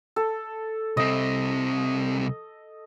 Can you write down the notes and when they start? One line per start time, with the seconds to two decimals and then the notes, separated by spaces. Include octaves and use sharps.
0.16 A4
0.97 C2 C4 D#5